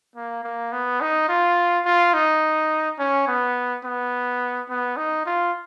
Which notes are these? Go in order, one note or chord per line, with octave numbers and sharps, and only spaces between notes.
A#3
A#3
B3
D#4
F4
F4
D#4
C#4
B3
B3
B3
D#4
F4